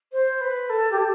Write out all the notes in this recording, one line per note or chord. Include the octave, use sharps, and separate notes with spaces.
C5
B4
A4
G4
A4